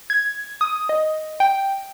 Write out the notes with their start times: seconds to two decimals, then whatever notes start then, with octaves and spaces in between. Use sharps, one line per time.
0.10 G#6
0.61 D#6
0.89 D#5
1.40 G5